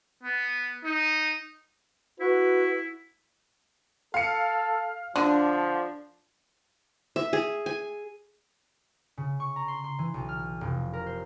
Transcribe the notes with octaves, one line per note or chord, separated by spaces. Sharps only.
B3
D#4
E4 F#4 B4
A4 F5 C#7
D3 F3 D4
E5
G#4
G#5
C#3
C#6
A#5
C6
C6
E3
B1
F6
F1
A#4
C5